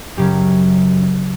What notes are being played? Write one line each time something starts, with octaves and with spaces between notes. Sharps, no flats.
F#2 C#3 F#3 C#4 G4